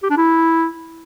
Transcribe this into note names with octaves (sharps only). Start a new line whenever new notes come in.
G4
D4
E4